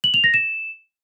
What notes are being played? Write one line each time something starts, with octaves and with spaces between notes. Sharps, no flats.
F#7
F7
A#6
E7